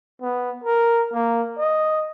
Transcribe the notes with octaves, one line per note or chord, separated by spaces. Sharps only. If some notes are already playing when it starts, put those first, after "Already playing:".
B3
A#4
A#3
D#5